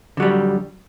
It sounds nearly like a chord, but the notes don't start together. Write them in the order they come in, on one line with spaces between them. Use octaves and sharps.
D3 F#3 G3